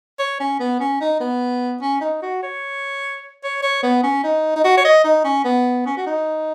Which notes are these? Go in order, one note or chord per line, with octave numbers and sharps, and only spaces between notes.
C#5
C#4
B3
C#4
D#4
B3
C#4
D#4
F#4
C#5
C#5
C#5
B3
C#4
D#4
D#4
F#4
C#5
D#5
D#4
C#4
B3
C#4
F#4
D#4